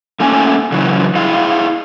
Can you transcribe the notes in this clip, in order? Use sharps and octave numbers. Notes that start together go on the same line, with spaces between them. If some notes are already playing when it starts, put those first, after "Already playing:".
A3 A#3 C#4 G#5
C#3 E3 F#3
E4 G#4 F5